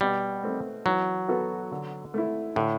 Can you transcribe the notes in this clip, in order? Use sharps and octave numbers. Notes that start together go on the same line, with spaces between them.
B2 G3
A3 C4
E3 F#3
B3 F#4 A4
D3
A3 E4
A2 D3